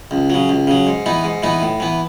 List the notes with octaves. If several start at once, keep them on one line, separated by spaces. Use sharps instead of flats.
C#2
C#3 F#3
C#2
C#3 F#3
G#2
E3 B3 D#4
G#2
E3 B3 D#4
A2
E3 B3